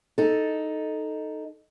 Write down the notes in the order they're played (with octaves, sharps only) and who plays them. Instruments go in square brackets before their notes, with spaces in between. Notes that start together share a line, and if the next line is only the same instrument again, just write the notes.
[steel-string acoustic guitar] D#4 A4